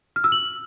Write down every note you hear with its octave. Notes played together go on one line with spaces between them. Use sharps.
F6
E6
F#7